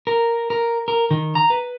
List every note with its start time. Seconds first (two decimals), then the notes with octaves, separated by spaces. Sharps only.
0.07 A#4
0.50 A#4
0.88 A#4
1.11 D#3
1.35 A#5
1.50 B4